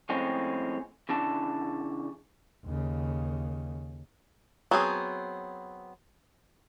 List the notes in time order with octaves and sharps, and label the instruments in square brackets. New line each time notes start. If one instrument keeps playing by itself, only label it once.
[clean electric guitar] F2 A2 G#3 C4 C#4
C#3 E3 D4 A5
[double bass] D#2 C#3
[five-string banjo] F#3 B3 C4 G#4